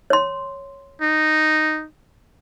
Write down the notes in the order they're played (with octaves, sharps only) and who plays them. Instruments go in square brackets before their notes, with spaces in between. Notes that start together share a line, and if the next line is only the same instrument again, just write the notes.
[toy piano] C#5 C6
[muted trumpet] D#4